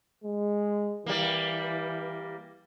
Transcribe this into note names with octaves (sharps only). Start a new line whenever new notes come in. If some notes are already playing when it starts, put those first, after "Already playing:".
G#3
E3 G3 A#3